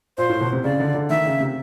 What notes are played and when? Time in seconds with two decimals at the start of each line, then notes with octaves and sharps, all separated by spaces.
0.17 A#2 C5
0.29 A2
0.41 B2
0.53 C3
0.64 C#3 D5
0.80 D3
0.94 D3
1.10 D#3 E5
1.26 C#3
1.40 C3